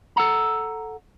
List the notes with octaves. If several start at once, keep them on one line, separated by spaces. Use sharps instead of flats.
A4 F#5 A#5